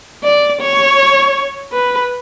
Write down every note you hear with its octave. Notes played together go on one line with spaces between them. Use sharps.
D5
C#5
B4